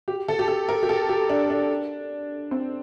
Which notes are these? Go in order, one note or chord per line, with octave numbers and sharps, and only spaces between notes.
G4
A4
G4
A4
A#4
G4
A4
G4
D4
D4
C4